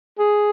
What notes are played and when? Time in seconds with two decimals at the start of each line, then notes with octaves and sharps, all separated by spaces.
0.19 G#4